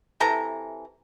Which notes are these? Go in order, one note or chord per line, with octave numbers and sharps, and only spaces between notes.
C3 E3 A4 A#5